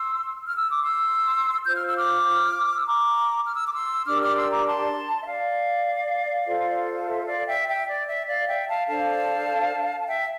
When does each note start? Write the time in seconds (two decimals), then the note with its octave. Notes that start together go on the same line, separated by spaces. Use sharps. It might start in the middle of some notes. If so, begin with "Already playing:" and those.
Already playing: C6 E6
0.46 F6
0.58 E6
0.71 D6
0.83 C6 E6
1.66 F4 C5 G6
1.76 F6
1.87 E6
1.97 D6 F6
2.75 E6
2.86 A#5 D6
3.46 F6
3.55 E6
3.65 D6
3.73 C6 E6
4.06 D4 G4 A#4 D6 F6
4.15 E6
4.22 D6 F6
4.37 C6 E6
4.52 A#5 D6
4.66 A5 C6
5.22 E5
5.26 D5 F5
6.47 F4 A4 C5
7.08 E5
7.27 D5 F5
7.47 E5 G5
7.68 E5 G5
7.88 D5
8.07 E5
8.27 D5 F5
8.47 E5 G5
8.68 F5 A5
8.88 D4 A4 C5 F5 A5
10.01 A5
10.08 E5 G5